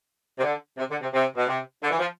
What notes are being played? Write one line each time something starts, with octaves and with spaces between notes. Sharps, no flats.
C3
D3
C3
D3
C3
C3
B2
C3
D3
E3
F3